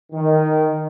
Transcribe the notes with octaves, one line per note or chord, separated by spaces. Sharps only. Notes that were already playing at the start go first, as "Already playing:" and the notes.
D#3